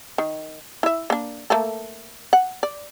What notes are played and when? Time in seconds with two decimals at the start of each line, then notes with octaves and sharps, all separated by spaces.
0.18 D#3
0.83 E4 E5
1.10 A#3 D4
1.50 A3 A#3 A4
2.33 F#5
2.63 D5